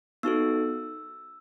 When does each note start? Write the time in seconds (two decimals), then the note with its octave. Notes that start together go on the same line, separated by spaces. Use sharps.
0.23 B3 D#4 F#4 A4 E6